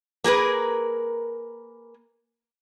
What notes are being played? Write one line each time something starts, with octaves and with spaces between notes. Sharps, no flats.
A#3 G#4 A#4 B4